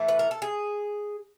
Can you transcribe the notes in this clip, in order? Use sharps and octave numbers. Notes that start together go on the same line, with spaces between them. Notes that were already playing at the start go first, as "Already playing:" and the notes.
Already playing: A2 E3 A3
B4
A#4
A4
G#4